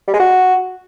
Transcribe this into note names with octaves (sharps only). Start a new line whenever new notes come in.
G3
G#3
F#4